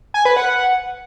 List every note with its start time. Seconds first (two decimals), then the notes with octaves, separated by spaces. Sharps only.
0.14 G#5
0.25 B4
0.36 F#5